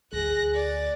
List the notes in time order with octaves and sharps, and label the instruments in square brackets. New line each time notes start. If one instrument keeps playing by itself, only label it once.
[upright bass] D2 [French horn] G#4 [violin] F#6 A#6
[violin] D5